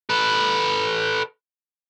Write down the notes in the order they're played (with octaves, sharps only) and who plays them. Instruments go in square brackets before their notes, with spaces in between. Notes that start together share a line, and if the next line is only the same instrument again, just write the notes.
[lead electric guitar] A4 B4